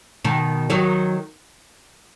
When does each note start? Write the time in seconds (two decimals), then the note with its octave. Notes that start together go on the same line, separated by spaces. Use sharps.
0.24 B2 D#3
0.70 D#3 F#3